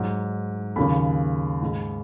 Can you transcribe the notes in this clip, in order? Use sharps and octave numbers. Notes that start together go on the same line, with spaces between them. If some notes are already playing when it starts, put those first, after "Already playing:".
Already playing: G#2 F#3
D#2 C#3 F#3 B5
G#2 G#3